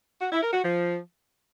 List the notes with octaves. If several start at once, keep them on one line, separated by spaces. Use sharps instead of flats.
F#4
E4
A#4
F#4
F3